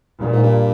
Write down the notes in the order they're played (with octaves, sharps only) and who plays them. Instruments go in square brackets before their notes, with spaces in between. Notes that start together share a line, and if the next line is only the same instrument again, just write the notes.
[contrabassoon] G2 [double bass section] A#2
[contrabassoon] G#2
G2